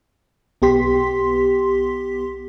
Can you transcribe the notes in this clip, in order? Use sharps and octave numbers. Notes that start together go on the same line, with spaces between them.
B1 B3 G4 C6 B6